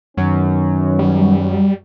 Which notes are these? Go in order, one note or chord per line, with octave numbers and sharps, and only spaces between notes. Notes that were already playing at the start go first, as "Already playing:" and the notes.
F#2 D#3 F#3 B3 C#4
G3